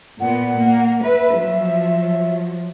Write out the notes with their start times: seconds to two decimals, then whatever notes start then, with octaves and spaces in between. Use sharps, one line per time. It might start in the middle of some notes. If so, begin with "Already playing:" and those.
0.20 A#2 B3 F#5
0.59 A#3
1.04 B4 E5
1.34 F3 F#3